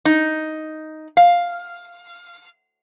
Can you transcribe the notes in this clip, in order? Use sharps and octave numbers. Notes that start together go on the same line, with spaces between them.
D#4
F5